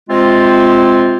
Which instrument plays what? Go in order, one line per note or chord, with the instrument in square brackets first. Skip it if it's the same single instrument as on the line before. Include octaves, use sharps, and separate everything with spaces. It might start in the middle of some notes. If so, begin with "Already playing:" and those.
[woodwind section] C3 G#3 C4 F4